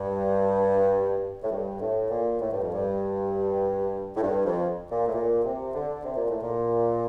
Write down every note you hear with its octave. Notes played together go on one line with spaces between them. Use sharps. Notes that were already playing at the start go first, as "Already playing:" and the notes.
Already playing: G2
A2
G2
A2
A#2
A2
G2
F2
G2
A2
G2
F2
A#2
A2
A#2
C3
D3
C3
A#2
A2
A#2